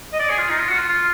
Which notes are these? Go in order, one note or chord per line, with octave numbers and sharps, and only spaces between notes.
D#5
D5
G#4
F4
D#4
F4
F#4
F4
F4